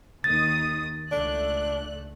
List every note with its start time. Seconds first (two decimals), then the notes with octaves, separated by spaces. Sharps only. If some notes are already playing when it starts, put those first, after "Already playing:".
0.24 D#2 D#3 D#6 A6
1.12 C#2 A3 D4 F#6